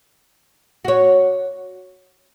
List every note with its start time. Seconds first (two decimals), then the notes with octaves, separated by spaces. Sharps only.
0.85 F#4 C#5